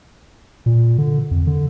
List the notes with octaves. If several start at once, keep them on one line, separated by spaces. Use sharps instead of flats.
A#2
D3
F2
D3